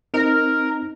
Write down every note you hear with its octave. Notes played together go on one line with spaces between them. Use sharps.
C4 D#4 A#4